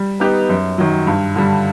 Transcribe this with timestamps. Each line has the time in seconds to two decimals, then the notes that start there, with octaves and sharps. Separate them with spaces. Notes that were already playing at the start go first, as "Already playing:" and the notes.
Already playing: G3
0.20 B3 D#4 G4 B4
0.49 F#2
0.78 D#3 F#3
1.07 G2
1.36 D3 G3